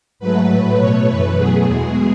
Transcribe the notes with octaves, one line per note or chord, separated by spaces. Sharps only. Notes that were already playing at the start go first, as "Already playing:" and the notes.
G#2 F#3 A3 B4
A2 F#3 A3
B2 A3 C#5
F#2 E3 A3 B4
B2 F#3 A3 G#4
E2 B2 G#3 G#4